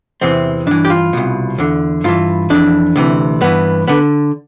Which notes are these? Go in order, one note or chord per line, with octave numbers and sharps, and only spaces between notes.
E2 C3 E3 C4
G2 E3 D4
G4
F4
C2 B2
E2 D3
G2 E3 F4
F2 E3 D4
D2 C3 E3
G2 E3 B3
D3 B3